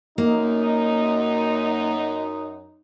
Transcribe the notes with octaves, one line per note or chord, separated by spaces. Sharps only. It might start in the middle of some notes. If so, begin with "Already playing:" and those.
F#2 A#3 D#4